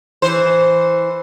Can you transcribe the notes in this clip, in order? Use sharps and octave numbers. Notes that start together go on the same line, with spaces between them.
E3 C5